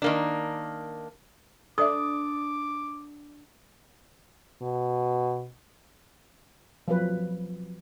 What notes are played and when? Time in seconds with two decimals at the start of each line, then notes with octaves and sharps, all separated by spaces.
0.02 D#3 A#3 D4
1.78 D4 A4 D5 E5 D6 D#6
4.62 B2
6.88 F3 F#3 B4